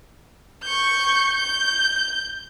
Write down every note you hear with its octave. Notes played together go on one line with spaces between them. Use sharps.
C#6 G6
G6